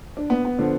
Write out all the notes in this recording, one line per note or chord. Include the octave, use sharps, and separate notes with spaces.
D4
B3
B3
D3 F3